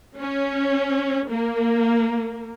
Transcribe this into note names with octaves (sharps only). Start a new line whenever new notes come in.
C#4
A#3